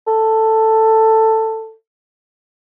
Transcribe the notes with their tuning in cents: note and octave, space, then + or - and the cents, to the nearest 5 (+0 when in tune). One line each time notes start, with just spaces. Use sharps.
A4 +10